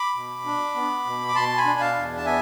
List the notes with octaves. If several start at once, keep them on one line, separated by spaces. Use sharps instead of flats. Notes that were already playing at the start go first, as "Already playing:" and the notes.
Already playing: B5 D6
B2
D4
B3
B2
D6
B2 A5 C6
G#5 B5
D4
F5 A5
E2
A5
B3 E5 G#5